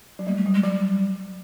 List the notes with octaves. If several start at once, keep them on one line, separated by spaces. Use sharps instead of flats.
F#3
G3 A#3
A3
G3
G#3
F#3 G3